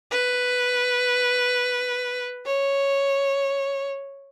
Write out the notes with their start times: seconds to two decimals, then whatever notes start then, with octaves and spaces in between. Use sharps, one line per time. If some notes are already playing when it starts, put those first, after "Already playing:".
0.11 B4
2.46 C#5